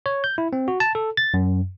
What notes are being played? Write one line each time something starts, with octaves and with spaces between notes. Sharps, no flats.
C#5
G6
E4
C4
F#4
A5
A4
A6
F#2